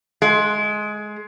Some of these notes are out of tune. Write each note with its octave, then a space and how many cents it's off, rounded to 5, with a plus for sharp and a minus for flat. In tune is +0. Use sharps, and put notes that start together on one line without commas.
G#3 +20